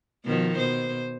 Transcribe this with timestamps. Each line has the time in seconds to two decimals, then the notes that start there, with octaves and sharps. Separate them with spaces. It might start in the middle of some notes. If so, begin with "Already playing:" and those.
0.25 B2 D#3 F3
0.57 B2 C5